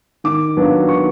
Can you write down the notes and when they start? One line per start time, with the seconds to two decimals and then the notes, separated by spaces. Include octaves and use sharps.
0.24 D#3 D6
0.57 F#3 B3 D4 F4
0.89 D#3 C#6